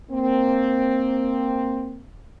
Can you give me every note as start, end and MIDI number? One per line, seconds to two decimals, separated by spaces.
0.11 2.05 58
0.11 2.05 60